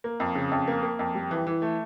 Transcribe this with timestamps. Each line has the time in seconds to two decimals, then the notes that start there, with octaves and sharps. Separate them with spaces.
0.04 A#3
0.20 F2
0.35 C#3
0.52 F2
0.68 A#3
0.83 A#3
0.99 F2
1.15 G3
1.31 E3
1.47 E3
1.62 A3